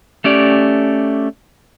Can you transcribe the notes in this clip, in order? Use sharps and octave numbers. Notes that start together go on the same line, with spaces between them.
A3 C#4 G4 D5